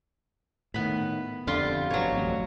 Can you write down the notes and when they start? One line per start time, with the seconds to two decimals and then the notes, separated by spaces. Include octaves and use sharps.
0.74 A2 D#3 B3 B5
1.47 F2 D3 G3 F4 C6
1.90 G1 B2 F#3 C#5
2.12 A1 F2